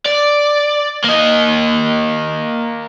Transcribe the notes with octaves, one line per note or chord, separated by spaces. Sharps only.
D5
A#3 D#5